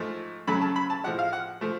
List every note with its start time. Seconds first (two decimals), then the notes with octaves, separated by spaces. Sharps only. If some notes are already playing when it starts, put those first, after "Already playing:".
Already playing: G#2 F3 A3
0.47 F#2 C#3 F#3 A3 B5
0.61 A5
0.76 B5
0.90 A5
1.04 A2 F3 G#3 F#5
1.19 F5
1.33 F#5
1.61 F3 A3